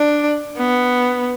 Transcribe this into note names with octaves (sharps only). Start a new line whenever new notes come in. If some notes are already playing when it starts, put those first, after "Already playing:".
Already playing: D4
B3